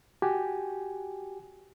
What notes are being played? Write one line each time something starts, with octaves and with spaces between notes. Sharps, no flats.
F#4 G4 G5 G#5